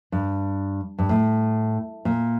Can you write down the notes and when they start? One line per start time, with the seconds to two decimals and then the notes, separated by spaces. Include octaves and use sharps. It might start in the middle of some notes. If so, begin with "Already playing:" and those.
0.12 G2
0.98 G2
1.09 A2
2.05 A#2